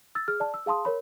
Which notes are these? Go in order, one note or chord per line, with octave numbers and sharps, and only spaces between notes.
E6 A6
G#4 F6
D5 A5
E6
G#4 F5 A5 C6 D#6
A#4 C#5 B5